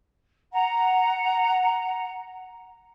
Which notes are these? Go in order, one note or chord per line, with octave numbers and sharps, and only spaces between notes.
F#5 A#5